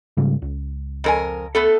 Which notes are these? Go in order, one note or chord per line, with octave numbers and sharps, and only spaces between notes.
G#2 C#3 G3
C#2
F2 A#4 G#5
A3 B3 A4